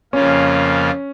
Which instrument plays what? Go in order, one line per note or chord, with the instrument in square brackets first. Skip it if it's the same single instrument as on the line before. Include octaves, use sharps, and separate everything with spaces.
[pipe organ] F2 C#3 A#3 F4 [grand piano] C#4